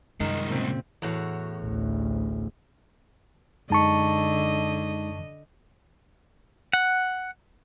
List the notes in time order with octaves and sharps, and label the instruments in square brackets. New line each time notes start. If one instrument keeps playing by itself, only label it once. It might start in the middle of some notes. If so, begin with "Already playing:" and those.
[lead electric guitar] C2 G#3 [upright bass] F#2 [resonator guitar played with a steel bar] D#3
[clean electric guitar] A#2 C#3 C4
[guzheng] E2 A2 F#4
[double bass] A1 D2
[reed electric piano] F#2 A5 C#6 [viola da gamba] D3 D#5 [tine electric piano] G#3 D#4
[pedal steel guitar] F#5